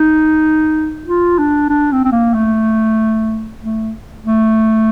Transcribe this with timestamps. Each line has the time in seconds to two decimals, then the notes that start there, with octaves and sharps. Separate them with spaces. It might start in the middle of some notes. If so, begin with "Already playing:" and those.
Already playing: D#4
1.06 F4
1.39 D4
1.70 D4
1.92 C4
2.05 C4
2.12 A#3
2.34 A3
3.62 A3
4.26 A3